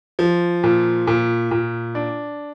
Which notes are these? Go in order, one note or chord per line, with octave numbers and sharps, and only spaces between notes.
F3
A#2
A#2
A#2
D4